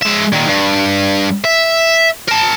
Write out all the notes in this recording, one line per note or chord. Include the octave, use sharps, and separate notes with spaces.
G#3 E5
A#2 D#3
G2
E5
A#4 A5